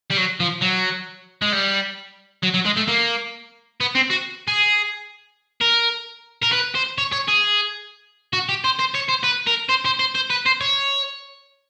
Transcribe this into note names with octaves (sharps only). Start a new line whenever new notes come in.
G3
F#3
F3
F#3
G#3
G3
F#3
F#3
G#3
A3
A#3
B3
C4
F#4
G#4
A#4
A#4
B4
C5
C#5
C#5
G#4
F#4
G4
C5
C5
C#5
C5
B4
A#4
C5
C5
C5
C5
B4
C5
C#5